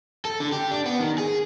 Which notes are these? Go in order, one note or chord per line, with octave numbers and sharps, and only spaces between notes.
A4
D3
G4
D4
B3
D#3
G#4